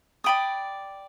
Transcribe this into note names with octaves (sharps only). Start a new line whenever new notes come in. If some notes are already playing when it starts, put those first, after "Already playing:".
D5 G5 B5 D#6